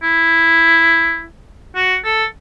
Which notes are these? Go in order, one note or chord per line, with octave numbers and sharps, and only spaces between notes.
E4
F#4
A4